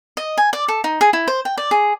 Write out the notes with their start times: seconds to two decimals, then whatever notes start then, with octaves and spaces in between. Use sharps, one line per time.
0.17 D#5
0.38 G#5
0.53 D5
0.68 A4
0.84 D#4
1.01 G#4
1.13 E4
1.28 C5
1.45 G5
1.58 D5
1.71 G#4